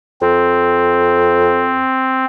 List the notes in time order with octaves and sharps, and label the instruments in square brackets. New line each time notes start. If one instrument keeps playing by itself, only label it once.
[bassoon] F2 [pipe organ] C4